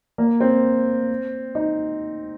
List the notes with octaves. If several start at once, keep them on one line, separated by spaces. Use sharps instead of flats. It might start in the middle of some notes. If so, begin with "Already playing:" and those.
A#3
C4
D#4